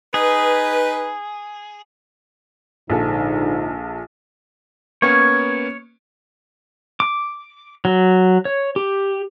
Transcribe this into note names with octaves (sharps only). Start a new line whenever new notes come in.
D#4 G#4 B4
A#1 G#2 D3 D#4 A4
A#3 B3 C#4 C#5
D6
F#3
C#5
G4